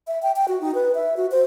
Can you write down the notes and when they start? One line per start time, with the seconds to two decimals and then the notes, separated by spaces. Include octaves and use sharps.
0.07 E5
0.23 G5
0.36 G5
0.48 F#4
0.61 D#4
0.75 B4
0.95 E5
1.17 F#4
1.31 C5